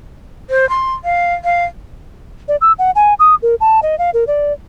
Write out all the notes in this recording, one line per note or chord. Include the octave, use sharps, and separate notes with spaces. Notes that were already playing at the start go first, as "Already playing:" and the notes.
C5
C6
F5
F5
D5
E6
F#5
G#5
D#6
A#4
A5
D#5
F5
A#4
D5